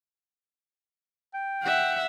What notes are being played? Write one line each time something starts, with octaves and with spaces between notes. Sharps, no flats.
G5
E5 F#5